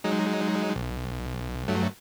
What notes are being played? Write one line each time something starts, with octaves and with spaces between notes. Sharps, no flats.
F#3 G#3 D#4
B1
G2 F#3 A3